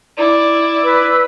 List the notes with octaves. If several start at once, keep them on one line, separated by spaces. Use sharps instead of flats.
E4 D5
B4 E6